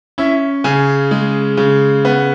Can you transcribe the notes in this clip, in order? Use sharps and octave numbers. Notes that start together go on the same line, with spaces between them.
C#4 E4 E5
C#3 G#4 G#5
G#3
C#3
B3